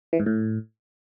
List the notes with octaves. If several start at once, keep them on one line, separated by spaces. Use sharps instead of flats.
E3
G#2
A2